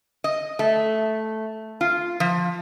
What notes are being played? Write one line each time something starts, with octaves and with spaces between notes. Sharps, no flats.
D#5
A3
F4
F3